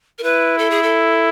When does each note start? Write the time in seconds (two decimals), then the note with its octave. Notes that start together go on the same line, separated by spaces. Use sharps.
0.19 A#4
0.23 E4 B4
0.58 A4
0.70 G#4
0.83 A4